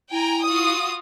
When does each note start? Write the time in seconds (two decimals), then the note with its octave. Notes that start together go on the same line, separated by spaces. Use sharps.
0.11 E4 G5 G#5 A#5
0.45 F4 F#4 D#6